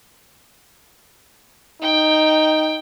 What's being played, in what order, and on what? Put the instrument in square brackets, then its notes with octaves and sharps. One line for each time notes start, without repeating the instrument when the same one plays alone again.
[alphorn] D#4 [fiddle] G5